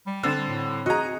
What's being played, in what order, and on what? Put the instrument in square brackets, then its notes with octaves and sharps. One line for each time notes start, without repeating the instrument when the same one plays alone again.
[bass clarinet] G3
[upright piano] D3 [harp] C4 A6 E7
[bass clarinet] A2
[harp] F#4 G#4 [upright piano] D#5 A#5